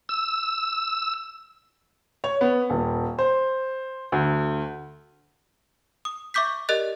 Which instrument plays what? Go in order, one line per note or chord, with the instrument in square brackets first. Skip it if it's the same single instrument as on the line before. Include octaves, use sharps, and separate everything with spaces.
[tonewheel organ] E6
[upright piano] C#5
B3
D#1
C5
D2
[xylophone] D#6
E5 C#6 D6 G6 B6
G4 A#4 D5 D#5 F#6 A6